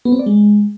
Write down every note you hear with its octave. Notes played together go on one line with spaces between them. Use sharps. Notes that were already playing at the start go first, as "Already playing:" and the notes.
B3
C4
D5
G#3